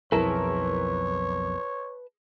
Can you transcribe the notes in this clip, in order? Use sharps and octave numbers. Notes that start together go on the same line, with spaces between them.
B1 F2 E4 G#4 A#4 B4 C#5 A5